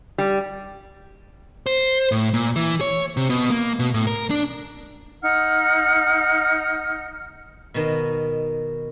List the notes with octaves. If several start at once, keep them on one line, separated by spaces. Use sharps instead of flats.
G3
C5
A2
A#2
E3
C#5
C3
B2
A#3
B2
A2
A#4
D4
D#4 F#5 F6
B2 D#3